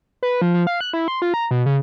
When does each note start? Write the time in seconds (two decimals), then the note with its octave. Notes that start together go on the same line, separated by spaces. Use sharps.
0.23 B4
0.42 F3
0.54 F3
0.67 F5
0.81 F#6
0.93 E4
1.08 C6
1.22 F4
1.34 A#5
1.51 B2
1.66 C#3